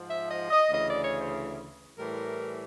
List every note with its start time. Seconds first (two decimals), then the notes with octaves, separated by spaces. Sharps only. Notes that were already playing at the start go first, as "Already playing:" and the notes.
Already playing: G#2 F3
0.09 E5
0.30 D#5
0.51 D#5
0.72 D2 C#3 E3 D#5
0.87 D5
1.02 C#5
1.18 C5
1.97 A2 E3 G3 A#4